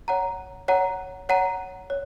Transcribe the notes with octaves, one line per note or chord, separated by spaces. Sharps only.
C#5 F#5 A#5
C#5 F#5 A#5
C#5 F#5 A#5
C#5